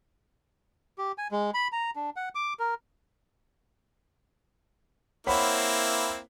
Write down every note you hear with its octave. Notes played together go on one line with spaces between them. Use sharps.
G4
G#5
G#3
B5
A#5
D4
F#5
D6
A#4
A#3 C4 E4 C#5 F#5 B5